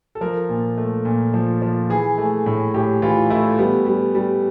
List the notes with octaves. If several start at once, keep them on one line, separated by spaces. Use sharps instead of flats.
A4
F3 A#4
A#2
A3
A#2
F3
F3
E3 G#4
A3
A2
A2 G4
E3 F4
A3 E4
G3 B3
G3
G3